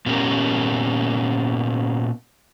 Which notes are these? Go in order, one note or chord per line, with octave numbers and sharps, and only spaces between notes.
A#2 B3 C#4 F#4 G4 A#4